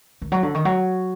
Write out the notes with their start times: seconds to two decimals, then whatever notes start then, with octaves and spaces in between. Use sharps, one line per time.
0.22 D#3
0.32 F#3
0.43 D3
0.54 D#3
0.65 F#3